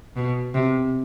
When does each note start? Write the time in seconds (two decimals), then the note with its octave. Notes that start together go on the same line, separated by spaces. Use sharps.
0.16 B2
0.54 C3